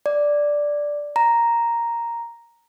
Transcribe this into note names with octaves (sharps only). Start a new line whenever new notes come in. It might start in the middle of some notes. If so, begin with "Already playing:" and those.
D5
A#5